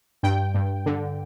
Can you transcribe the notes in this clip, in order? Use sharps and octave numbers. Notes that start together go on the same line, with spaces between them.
G2 G5
G2
D3